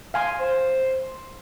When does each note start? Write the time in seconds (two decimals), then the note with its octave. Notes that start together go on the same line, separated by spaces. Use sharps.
0.14 F5 G#5 C6
0.39 C5